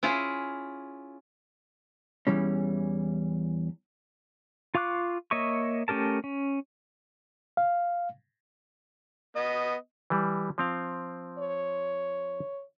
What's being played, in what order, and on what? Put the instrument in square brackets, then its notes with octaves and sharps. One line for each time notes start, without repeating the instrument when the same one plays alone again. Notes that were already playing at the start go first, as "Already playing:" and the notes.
[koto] C#4 E4 F4 G#4
[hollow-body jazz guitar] E2 G2 E3 G3 C#4
[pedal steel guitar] F4 F5 C#6 D6 F#6
A#3 C#5 D#5 E5 C#6
A3 C#4 G4 A#4 A5
C#4
[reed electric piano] F5
[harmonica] B3 D#5
[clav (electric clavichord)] E3 G3
F3 C4 F5
[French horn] C#5